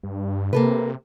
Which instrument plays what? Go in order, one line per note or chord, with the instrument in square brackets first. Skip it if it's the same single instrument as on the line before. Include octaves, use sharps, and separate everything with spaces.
[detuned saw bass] G2
[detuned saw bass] C3 [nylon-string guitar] A#3 A4 B4